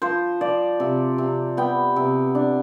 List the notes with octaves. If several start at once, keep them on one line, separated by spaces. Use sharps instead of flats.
F3 C5
F3 D5
C3
C3
B3 G5
C3
D4